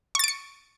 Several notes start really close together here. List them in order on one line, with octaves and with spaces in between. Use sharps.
C#6 A6 D7 C#7